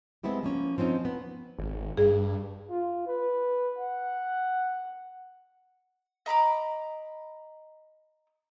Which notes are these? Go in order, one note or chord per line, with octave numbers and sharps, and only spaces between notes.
G#3 B3 C4 E4 G4
F3 A#3 C#4
F3 C4 C#4 D#4
B3
G#1
G2 G#4
F4
B4
F#5
D#5 A#5 B5 D6